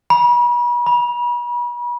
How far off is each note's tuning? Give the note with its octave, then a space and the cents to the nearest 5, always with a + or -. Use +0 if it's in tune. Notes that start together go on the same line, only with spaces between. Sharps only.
B5 -40
B5 -35